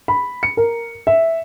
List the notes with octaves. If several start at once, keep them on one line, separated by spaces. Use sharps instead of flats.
B5
C#7
A#4
E5